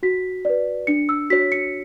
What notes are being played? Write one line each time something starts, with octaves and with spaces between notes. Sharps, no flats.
F#4 B6
B4 D5
D4 C#7
E6
F#4 C#5 B6
C#7